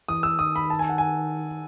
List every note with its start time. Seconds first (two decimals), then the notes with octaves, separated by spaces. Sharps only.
0.09 E3 D#6
0.23 E6
0.39 D#3 D#6
0.56 B5
0.70 A5
0.79 G#5
0.89 F#5
0.98 G#5